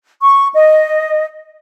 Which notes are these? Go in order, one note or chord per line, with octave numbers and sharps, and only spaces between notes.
C#6
D#5